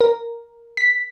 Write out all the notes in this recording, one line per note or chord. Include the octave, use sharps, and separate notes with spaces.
A#4
B6